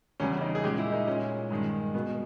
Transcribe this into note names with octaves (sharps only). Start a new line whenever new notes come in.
E2 C#3 G3 C#4
D#4
G#4
A#2 G#3 G4
E4
D#4
A#2 G#3 C#4
G2 D#3 G#3
B2 G#3 B3